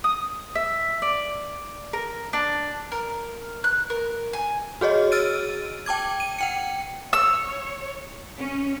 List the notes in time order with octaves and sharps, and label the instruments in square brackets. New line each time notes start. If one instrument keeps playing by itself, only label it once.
[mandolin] D#6
E5
D5
A#4
D4
A#4
F#6
A#4
G#5
[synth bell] F#4 G#4 C#5 D#5
E6 F6 A6 D7 D#7
G5 A5 D6 G#6
D#7
F#5 G5 C#7
[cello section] C#5 [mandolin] E6
[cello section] C#4